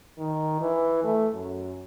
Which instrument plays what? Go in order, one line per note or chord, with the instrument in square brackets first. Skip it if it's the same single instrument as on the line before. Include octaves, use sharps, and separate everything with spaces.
[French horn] D#3
E3
A3
F#2